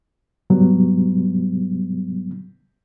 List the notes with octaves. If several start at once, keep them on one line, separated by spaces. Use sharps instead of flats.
G#2 C3 F#3 G3 B3